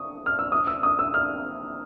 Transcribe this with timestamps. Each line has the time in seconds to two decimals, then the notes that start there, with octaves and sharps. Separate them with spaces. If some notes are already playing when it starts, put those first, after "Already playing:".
Already playing: C#6 D#6
0.26 F6
0.39 E6
0.52 D#6
0.67 E6
0.83 D#6
0.99 E6
1.14 F6